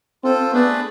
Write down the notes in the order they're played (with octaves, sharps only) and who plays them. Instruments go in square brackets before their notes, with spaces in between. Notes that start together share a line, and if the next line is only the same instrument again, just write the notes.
[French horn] C4 [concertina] F4 A4 C5
[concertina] A3 D4 G#4 B4 D5 [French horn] B3